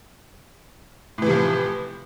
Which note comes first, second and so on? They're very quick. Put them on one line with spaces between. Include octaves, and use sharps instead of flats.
A2 E3 C3 F3